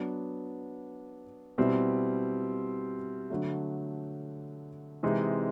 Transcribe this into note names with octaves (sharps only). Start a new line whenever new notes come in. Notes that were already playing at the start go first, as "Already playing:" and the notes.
Already playing: F#3 B3 D4
B2 G3 C4 E4
D3 F#3 A3
C3 E3 G#3 C4 D#4